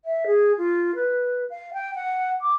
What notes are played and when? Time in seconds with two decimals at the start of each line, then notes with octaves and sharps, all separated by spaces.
0.05 E5
0.27 G#4
0.58 F4
0.95 B4
1.50 F5
1.73 G5
1.95 F#5
2.41 D6